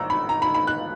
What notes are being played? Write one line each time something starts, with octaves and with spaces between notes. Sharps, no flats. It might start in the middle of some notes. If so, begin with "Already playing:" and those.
Already playing: G#1 A#5 E6
B5
A#5
B5
B5
F#6